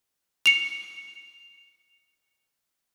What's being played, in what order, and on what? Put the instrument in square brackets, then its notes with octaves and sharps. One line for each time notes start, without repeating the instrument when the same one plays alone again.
[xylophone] C#7 F7